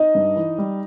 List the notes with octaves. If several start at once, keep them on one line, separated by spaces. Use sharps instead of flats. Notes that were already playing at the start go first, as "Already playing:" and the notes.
Already playing: D#4 D#5
G2
E3
G3